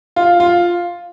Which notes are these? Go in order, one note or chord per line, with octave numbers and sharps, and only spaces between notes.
F4
F4